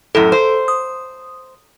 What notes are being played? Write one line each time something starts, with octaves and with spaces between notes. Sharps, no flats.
F#2 A2 A4
C5
D#6